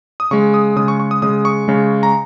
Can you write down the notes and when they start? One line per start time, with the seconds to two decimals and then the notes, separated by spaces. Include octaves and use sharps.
0.20 D#6
0.31 C#3 G#3 C#6
0.54 D#6
0.76 C#3 G#3 D#6
0.88 C#6
1.00 C#6
1.11 D#6
1.22 C#3 G#3 D#6
1.45 C#6
1.68 C#3 G#3
2.03 A#5